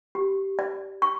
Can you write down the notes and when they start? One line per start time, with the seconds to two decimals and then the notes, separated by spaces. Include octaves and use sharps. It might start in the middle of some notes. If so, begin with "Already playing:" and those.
0.15 G4
0.59 D5
1.02 C#6